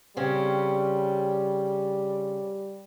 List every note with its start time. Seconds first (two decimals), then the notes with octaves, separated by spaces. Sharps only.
0.17 C#3 G3 C4 C#4